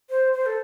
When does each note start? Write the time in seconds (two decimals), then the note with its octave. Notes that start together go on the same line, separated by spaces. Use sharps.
0.10 C5
0.33 C5
0.46 A4